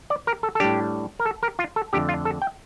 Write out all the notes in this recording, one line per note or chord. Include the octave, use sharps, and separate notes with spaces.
D5
A#4
A4
A4
A2 G3 D4 G4
A#4
A4
A#4
F4
A4
F2 D3 A3 G4
F4
A4
G5